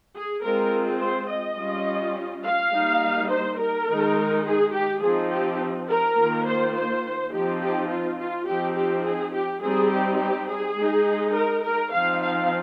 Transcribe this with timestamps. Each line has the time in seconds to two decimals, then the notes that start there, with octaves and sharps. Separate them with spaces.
0.15 G#4
0.43 G#3 C4 F4 A#4
1.01 C5
1.29 D#5
1.58 G3 C#4 F4
2.45 F5
2.73 G3 A#3 D#4
3.30 C5
3.60 A#4
3.88 D#3 G#3 D#4
4.45 G#4
4.73 G4
5.02 F3 C4 D#4 G#4
5.32 G4
5.89 A#4
6.18 D#3 A#3 F4
6.46 C5
6.75 C5
7.33 F3 C4 D#4 G4
7.62 G4
7.89 F4
8.19 F4
8.47 F3 C4 D#4 G4
8.76 G4
9.05 G#4
9.34 G4
9.62 G3 C4 D#4 G#4
9.91 G4
10.20 G4
10.49 G#4
10.77 G#3 D#4
11.34 A#4
11.64 A#4
11.92 F3 C4 D#4 F5
12.22 F5